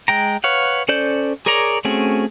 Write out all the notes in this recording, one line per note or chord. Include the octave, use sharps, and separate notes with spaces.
G#3 G5 A#5
B4 C#5 F5 F#5
C#4 A4 C5 D5 G6
G#4 A#4 C#5 D5 A#5
A3 C4 C#4 F#4 G#4